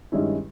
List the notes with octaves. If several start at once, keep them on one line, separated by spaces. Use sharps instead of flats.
G2 D#3 G#3 C#4 E4